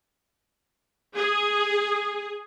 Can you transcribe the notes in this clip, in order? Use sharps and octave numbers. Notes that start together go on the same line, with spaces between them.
G#4